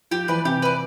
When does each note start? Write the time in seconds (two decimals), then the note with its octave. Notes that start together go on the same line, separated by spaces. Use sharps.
0.11 F3 G4
0.28 E3 B4 D5
0.45 C3 G4
0.62 B4 D5